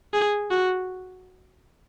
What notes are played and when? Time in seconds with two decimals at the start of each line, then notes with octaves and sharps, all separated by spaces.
0.13 G#4
0.51 F#4